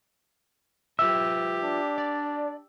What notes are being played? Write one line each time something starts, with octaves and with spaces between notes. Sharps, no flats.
F4 G4 B4 E5 E6
D4
D5